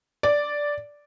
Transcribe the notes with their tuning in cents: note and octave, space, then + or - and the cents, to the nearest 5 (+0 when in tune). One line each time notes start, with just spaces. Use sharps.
D5 -5